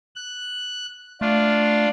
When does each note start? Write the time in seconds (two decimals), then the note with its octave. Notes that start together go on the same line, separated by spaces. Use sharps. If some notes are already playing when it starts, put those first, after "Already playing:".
0.16 F#6
1.21 A3 D4 F4